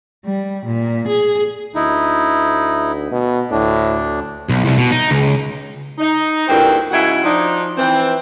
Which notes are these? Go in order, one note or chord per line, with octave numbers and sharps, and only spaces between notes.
G3
A#2
G#4
D2 D#4 E4
B2
D2 A2 D4
B1
C2
B2
D#4
C#2
D#4
D2 G2 A#2 C4 E4 C5
G#2 C#3 E4 F#4 D#5 F#5
F3 D4 D#4
E3 C4